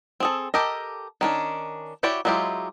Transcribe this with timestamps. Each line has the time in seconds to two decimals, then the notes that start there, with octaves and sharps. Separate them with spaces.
0.20 C4 G#4 A4
0.54 G4 A4 A#4 D#5
1.21 D#3 C#4 D4
2.03 E4 F#4 G4 C#5 D5
2.25 F#3 G#3 E4 F4 G4